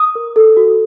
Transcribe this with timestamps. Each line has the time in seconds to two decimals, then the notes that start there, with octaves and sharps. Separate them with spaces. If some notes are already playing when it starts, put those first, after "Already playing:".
Already playing: D#6
0.15 A#4
0.36 A4
0.57 F#4